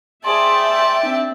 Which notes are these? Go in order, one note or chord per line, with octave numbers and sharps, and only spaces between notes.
G#4 C5 D5 E5 G5 A5 C6
C4 D4